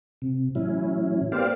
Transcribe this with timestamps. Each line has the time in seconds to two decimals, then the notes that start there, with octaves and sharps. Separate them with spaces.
0.22 C3
0.55 A2 E3 F#3 C#4 E4
1.32 A#3 B3 G4 C5 D5 F5